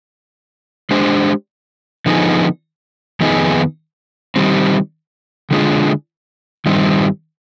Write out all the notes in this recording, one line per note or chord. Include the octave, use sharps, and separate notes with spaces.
G#3 D4 G4 C5
D3 F3 B3 D#4 G#4
F2 D#3 B3 D#4 G#4
D#3 G3 C4
D3 G#3 D4 F4 G#4
G2 D#3 G3 C4